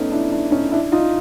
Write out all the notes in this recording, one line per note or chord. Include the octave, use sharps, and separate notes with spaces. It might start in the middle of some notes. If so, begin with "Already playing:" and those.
Already playing: A3 B3 C#4 D#4
D4 E4
D4 E4
C#4 D#4
D4 E4
D#4 F4